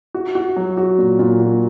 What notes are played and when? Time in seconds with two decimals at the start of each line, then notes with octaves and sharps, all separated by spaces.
0.14 F#4
0.35 F#4
0.56 F#3
0.77 F#4
0.98 A#2
1.19 A#2
1.40 F#4